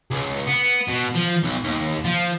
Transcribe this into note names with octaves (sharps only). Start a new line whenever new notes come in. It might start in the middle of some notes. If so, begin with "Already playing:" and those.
C#2
B3
B2
F3
B1
D#2
F3